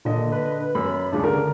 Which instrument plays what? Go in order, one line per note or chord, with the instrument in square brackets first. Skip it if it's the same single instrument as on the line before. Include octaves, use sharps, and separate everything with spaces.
[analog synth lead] A#2 [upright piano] D3 D#5
[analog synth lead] B4
[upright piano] F#2 [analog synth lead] B5
[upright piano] C#2 G2 C#3 [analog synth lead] D4
[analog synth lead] D3 [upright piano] A#4